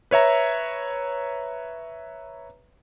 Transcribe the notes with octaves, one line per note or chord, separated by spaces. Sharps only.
B4 C#5 E5 A#5